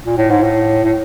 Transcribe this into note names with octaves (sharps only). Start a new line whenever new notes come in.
A#2
A2
G#2
A2
A2